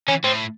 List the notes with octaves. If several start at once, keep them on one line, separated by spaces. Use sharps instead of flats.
E3 C#4
A2 C4